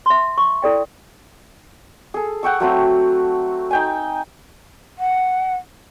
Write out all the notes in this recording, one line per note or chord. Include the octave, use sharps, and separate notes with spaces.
E5 C6
C#6
E4 A4 D5 G5
G#4 A4
F#5 G5 C#6 E6
F#3 A3 C4 F#4
D#4 G5 G#5
F#5